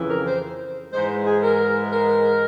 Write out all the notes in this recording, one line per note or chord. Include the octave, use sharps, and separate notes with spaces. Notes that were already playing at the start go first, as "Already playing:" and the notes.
Already playing: F2 C#3 E3
A#4
C5
G#2 E3 G#3 C5
G#4
A#4
A#4